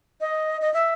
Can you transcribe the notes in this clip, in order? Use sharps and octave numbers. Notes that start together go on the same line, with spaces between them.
D#5
D#5
E5